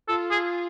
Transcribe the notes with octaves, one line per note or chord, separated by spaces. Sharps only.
F4 A4
G#4